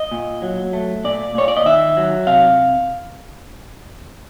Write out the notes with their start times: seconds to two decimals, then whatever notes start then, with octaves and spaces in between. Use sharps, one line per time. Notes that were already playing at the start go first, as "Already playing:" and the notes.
Already playing: D#5
0.11 A#2
0.42 F#3
0.73 A3
1.04 A#2 D5
1.35 A#2 C#5
1.48 D5
1.57 D#5
1.66 D#3 E5
1.97 F#3
2.27 C3 F5